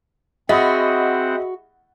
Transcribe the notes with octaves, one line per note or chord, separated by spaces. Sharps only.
C4 F#4 G#4 D#5 E5 F#5 B5 D#6